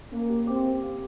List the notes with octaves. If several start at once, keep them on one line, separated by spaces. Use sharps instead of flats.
A#3 C#4
G4
C4 G4
G4
F5